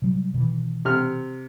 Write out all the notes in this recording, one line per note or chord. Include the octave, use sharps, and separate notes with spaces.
C3 F#3 G3
B2 D#3 E3
C3 F6